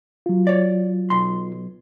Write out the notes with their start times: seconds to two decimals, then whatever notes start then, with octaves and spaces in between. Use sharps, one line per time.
0.26 F#3 F4
0.47 C#5 D5
1.10 B1 C6